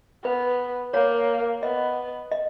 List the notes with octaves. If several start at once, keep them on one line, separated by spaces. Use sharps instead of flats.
B3 B4
A#3 C#5
B3 D#5
D#5